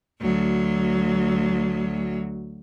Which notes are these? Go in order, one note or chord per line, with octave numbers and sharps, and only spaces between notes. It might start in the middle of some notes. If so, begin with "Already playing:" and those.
D2 F#3